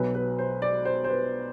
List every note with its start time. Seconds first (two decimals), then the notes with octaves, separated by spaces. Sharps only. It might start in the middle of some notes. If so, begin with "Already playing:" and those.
Already playing: B1 B2 F#3 B4
0.15 B4
0.39 C5
0.62 D5
0.85 C5
1.04 C5
1.09 B4